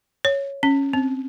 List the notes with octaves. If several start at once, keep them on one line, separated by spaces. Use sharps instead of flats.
C#5
C#4
C4